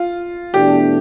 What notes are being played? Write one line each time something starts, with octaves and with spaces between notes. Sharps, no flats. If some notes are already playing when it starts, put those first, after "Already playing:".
Already playing: F4
E2 B2 A3 D4 G4